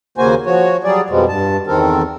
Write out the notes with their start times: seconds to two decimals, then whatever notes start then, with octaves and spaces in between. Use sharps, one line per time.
0.18 D#2 C#3 A#3 F#4 C5 G#5
0.46 F3 F#4 C#5
0.84 F#3 G3 G#4 D5
1.10 F2 B2 F3 G3 G#3
1.28 G2 A5
1.67 E2 D#3 C4 A4 A#4